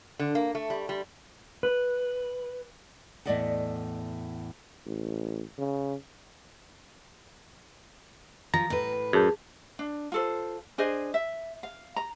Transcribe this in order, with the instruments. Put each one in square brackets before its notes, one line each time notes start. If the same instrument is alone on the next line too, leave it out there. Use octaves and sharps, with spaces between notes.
[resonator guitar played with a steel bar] D3
A#3
A3
G3
G3
[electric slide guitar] B4
[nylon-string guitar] E2 A2 A3 D5 D#5 F#5
[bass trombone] A1
C#3
[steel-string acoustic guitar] F3 [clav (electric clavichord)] A#5
[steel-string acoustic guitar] A2 B4
[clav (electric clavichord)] F#2 [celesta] G#4 A5 G6
[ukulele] D4
F4 A4 C5
D4 G#4 C5 D#5
E5
F5
A#5